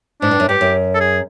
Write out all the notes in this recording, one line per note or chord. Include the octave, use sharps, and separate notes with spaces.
G#2 D4
G2
F#2
G2 G4
F#2
A4
G#4